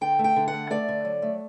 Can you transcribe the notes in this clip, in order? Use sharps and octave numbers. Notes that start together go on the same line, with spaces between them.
D3 G5
A3
G5
D3
F#5
A3
A3 D5
D3
F#3
A3